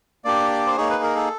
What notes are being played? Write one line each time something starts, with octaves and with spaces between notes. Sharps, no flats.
A#3 D4 G4 D5
C5
A#3 D#4 G#4 C#5
B4
A#4
A4